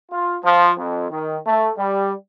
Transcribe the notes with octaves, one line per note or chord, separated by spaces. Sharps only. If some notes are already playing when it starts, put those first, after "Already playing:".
F4
F3
F2
D#3
A3
G3